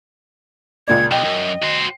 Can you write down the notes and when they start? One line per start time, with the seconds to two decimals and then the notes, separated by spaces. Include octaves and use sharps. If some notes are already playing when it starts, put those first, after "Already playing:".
0.88 C#2 A#2 D5 G#6
1.11 B1 D#5 G5
1.24 F#2
1.63 F#4 C5